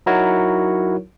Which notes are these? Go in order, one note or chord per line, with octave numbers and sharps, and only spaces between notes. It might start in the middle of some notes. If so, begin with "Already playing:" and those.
F#3 D#4 E4 F#4 A#4 C#5